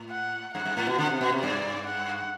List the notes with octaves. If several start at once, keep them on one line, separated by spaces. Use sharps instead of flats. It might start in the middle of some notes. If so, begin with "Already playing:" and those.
Already playing: A2
F#5
G2 F#5
G2
A2
B2
D3 F#5
C3
B2
C3
G2 D5
F#5